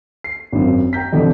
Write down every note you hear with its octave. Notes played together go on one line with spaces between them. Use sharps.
C7
G#1 F#2
G5 A#5 G6 B6
F2 B2 D3 E3 G3